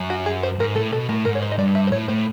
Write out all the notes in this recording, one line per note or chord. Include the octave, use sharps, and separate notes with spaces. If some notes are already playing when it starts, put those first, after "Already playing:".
Already playing: F#2
F#4
G#4
C5
G#2 A#4
A2 A4
B2 A4
A2 A#4
G#2 A#4
C#5
C5
D#5
G2 D5
E5
C5
A2 C#5
A2 C5